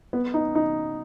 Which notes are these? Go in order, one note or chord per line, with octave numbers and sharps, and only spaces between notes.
B3
D#4
D#4